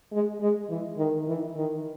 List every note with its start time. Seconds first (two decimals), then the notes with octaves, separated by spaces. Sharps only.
0.12 G#3
0.41 G#3
0.70 E3
0.98 D#3
1.28 E3
1.57 D#3